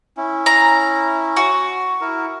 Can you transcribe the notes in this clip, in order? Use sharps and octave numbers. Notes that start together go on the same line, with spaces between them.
C#4 E4
A#5
F#4
E4 A#4